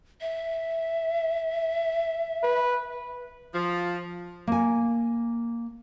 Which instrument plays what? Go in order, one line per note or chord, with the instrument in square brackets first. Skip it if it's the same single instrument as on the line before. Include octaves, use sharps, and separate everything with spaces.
[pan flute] E5
[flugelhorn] B4
[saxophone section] F3
[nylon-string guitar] A#3 G#5